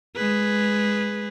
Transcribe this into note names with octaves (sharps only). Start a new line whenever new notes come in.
G#3 G#4 B4